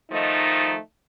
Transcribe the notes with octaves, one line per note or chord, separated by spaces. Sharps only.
D#3 F3 A3 D#4